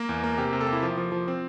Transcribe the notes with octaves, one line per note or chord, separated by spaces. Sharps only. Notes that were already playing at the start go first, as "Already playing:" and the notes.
Already playing: A#3 A#4
E2
A#3
C3 G4
C3
A4
A#3
E4
F3 F4
F3
F3
C4